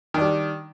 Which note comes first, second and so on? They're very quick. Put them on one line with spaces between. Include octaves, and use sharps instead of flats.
D#3 D4 G3